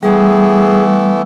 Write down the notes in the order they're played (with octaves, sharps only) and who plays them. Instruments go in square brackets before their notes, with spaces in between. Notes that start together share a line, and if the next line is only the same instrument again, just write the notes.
[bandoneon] E3 A3 B3 [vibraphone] G3 [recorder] G#4